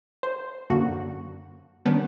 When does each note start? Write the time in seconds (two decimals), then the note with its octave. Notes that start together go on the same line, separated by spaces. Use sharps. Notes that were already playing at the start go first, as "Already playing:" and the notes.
0.23 C5
0.70 F#2 D3 A#3 F#4
1.85 D#3 G3 B3 C#4 D4